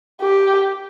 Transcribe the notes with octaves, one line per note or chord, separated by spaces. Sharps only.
G4